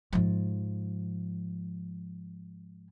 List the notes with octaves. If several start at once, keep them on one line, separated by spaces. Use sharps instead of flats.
G#2 F3